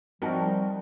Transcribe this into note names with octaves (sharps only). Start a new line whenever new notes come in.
F3 G3 C4 D#4 F#4 A#4 A5